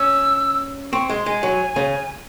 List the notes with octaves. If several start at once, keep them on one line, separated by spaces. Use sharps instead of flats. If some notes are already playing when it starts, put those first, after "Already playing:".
Already playing: C#4 E6
C4 C#6
G#3 C6
G#3 G#5
F#3
C#3